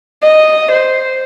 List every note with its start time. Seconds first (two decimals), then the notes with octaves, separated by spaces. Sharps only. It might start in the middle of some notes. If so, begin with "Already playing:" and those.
0.23 D#5
0.72 C5